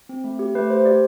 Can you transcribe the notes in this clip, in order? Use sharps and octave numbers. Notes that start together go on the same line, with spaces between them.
C4
A3
G4
A3 B4
G4 C5
G4 D5